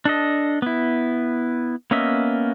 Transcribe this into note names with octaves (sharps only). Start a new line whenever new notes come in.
D4 A4 D#5
B3 E4
A#3 B3 C#4 D#5 E5